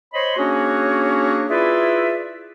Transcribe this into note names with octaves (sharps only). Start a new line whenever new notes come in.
C5 C#5 D#5 B5 C6
A#3 C#4 D4 F#4 G#4 C#5
E4 F4 G#4 B4 D5 E5